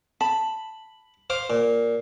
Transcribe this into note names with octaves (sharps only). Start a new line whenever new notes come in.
A5 B5
C5 F5 D6
A#2